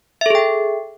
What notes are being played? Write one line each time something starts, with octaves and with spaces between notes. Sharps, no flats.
G#4 A4 E5 G5